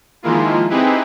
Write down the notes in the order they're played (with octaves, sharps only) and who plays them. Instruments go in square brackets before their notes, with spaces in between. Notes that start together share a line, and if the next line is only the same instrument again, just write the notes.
[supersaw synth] D#3 F3 G#3 A#3 E4 F4
C4 D#4 E4 G4 G#4 B4